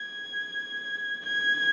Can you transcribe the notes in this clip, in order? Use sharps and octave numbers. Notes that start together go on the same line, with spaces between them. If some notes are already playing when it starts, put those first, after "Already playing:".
Already playing: G#6
G#6